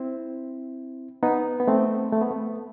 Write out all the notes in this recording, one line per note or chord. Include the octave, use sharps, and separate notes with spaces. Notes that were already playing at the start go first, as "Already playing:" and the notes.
Already playing: C4 E4
B3 D#4
B3
A3 C4
A3
B3
A3